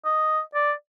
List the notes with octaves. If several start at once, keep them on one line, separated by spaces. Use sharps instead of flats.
D#5
D5